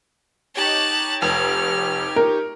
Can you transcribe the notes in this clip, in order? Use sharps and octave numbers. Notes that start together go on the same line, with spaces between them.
D#4 G4 C#5 A5 F#6
F1 F6
A#4